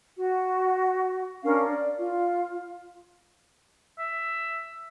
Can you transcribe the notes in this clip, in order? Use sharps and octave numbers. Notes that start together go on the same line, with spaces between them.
F#4
C#4 D4 A#4 F5
D5
F4
E5